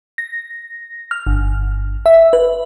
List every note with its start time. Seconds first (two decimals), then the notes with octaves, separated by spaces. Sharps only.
0.18 A#6
1.11 F6
1.27 G1
2.06 E5
2.33 B4